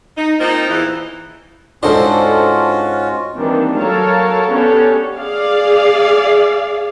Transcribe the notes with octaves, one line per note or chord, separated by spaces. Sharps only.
D#4
A#3 C4 D#4 F4 C5
E2 A#2 E3
G#2 C#4 D4 F4 F#4 A4 C5 D#5
D#3 E3 G3 A#3 C4 D4
F#3 A4 A#4 C#5 F5 A5
B3 C#4 D4 G4 A4 C#5
G#4 D5 F5